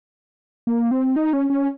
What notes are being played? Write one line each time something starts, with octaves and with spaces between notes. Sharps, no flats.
A#3
C4
D#4
C#4
C#4